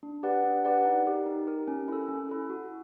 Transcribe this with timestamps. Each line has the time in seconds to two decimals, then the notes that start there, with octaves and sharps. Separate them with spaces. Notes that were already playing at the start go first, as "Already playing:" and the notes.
0.03 D4
0.23 G4 B4 D5 F#5
0.44 D4
0.65 G4 B4 D5 F#5
0.85 D#4
1.06 G4 A#4
1.26 D#4
1.47 G4 A#4
1.68 C#4
1.88 E4 A4
2.08 C#4
2.29 E4 A4
2.50 F#4